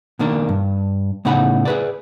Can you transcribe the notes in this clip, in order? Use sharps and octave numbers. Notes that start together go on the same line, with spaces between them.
B2 D#3 A#3 D4
G2
A2 C#3 B3 D#4 F#5 B5
G#4 B4 D5